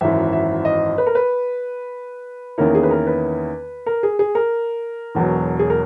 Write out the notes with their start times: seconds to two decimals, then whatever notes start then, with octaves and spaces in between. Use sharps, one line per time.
0.01 G#1 F#2 E3 E5
0.33 E5
0.65 D#5
0.98 B4
1.06 A#4
1.15 B4
2.58 E2 D#3 A#3 C#4 E4 A#4
2.75 G#4
2.83 B4
2.91 A#4
3.07 B4
3.86 A#4
4.03 G#4
4.19 G#4
4.35 A#4
5.15 E1 E2 B2 F#3
5.59 G#4
5.70 A#4